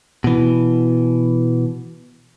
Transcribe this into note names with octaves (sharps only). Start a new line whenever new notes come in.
B2 E3